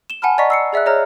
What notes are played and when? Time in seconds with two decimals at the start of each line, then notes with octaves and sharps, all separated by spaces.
0.10 E7 G7
0.22 F#5 G#5 A5 B5 F6
0.38 D5 D#5 A#5 C#6 B6
0.50 E6 C7 C#7
0.73 G#4 D5 E5 E6 F#6
0.86 G#4 C#5 D#5 A#5 F6